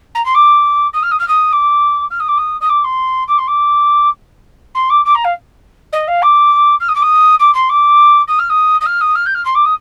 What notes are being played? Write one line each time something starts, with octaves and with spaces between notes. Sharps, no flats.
A#5
C6
D6
D#6
F6
D#6
F6
D#6
D6
F6
D#6
D6
D#6
D#6
D6
C6
D6
C6
D6
C6
D6
D6
A#5
F5
D#5
F5
D6
F6
D#6
D6
D#6
D6
C6
D6
D#6
F6
D#6
D#6
F6
D#6
F6
G6
F6
C6
D6
D#6